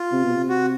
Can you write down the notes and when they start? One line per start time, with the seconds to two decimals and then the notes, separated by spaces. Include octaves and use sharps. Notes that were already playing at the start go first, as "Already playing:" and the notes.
Already playing: F4
0.12 C3
0.24 B2
0.36 C3
0.49 F#4